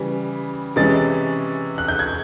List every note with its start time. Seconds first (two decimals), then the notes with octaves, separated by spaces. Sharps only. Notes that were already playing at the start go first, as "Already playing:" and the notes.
Already playing: C#3 E3 G3
0.76 C3 E3 G#3 C#4 A6
1.78 F#6
1.88 G6
1.99 G#6